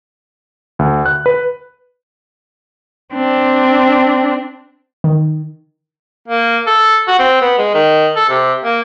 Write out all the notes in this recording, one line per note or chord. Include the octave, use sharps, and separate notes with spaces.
D2
F#6
B4
C4 D4
D#3
A#3
A4
F#4
C4
B3
G#3
D#3
A4
C3
A#3